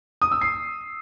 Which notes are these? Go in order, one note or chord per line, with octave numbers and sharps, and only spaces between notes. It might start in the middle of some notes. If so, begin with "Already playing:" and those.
D#6
E6
C7